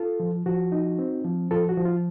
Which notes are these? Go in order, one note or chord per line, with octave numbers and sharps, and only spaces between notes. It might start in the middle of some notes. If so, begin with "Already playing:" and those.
Already playing: F4 A4
F3
F3 F#4
D#4
C4
F3
F3 F4 A4
F#4
F3
F4